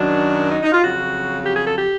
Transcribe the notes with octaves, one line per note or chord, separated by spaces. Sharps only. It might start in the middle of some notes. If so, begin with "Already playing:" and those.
Already playing: F#2 D#3 F#3 D4
D#4
D#4
F4
F2 C#3 F#3 F#4
G4
G#4
A4
G4